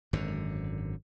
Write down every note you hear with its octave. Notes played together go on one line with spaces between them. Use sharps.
G#1 F#2 D3